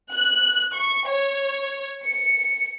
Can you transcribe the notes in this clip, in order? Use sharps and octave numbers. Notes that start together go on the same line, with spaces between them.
F#6
C#6
C#5
C#7